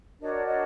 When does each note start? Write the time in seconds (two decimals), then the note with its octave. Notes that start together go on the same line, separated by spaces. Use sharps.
0.21 D4 F#4 A#4 C#5 D#5
0.33 D5
0.45 C#5 D#5